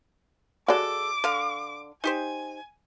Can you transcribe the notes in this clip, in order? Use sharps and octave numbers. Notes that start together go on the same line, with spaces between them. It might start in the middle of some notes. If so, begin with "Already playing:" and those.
G#3 F#4 A4 D5 D6
D3 F5
D#4 G4 C5 G#5